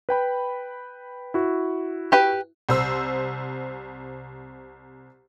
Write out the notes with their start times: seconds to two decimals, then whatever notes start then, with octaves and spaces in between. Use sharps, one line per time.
0.09 B4 G5 B5
1.34 E4 F#4
2.12 G4 B4 G5
2.69 C2 C5 E6